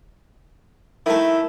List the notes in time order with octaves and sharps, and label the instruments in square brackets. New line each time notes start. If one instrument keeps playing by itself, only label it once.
[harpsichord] D#3 A3 [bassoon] E4